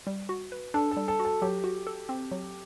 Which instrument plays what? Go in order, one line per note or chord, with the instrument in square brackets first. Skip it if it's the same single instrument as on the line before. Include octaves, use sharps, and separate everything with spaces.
[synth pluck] G3
F#4
B4
[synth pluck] D4 [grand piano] A4
[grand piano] A4
[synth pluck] G3
[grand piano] A4
[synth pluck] F#4
[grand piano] A4
[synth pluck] F#3 [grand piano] G4
[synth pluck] F#4
A4
C4
F#3